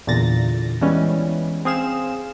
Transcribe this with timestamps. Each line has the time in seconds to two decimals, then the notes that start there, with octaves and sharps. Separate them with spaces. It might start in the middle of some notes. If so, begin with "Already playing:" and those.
0.07 E2 A#2 D3 A6 A#6
0.81 E3 G3 G#3 B3 C#4
1.65 C4 G#4 F5 E7